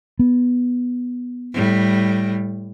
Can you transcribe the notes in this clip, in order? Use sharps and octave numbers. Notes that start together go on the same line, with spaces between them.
B3
A2 G3